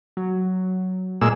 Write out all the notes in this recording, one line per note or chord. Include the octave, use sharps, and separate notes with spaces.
F#3
A#2 G#3 E6